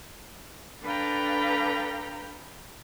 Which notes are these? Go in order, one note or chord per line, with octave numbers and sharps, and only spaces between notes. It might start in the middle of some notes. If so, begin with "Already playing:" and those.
D4 A4 B4 F5 G5 A#5